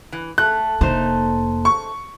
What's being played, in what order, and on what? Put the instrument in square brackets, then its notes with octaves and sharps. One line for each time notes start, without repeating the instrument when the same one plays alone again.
[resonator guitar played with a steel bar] E3
[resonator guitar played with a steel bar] A3 [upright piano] F#6
[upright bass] F1 A#3 [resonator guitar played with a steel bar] A3 D#4 C5
[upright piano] C#6